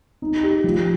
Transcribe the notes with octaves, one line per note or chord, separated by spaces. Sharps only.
D#4
G4
F3